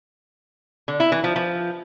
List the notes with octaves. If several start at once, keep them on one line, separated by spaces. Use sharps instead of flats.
D3
E4
E3
F3
F3